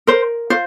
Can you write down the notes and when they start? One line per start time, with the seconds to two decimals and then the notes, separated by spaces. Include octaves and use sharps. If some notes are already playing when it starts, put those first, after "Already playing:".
0.07 A#4 C5
0.50 F4 C5